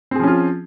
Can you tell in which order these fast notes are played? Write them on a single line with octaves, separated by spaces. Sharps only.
C4 G#4 F3 C#4 F4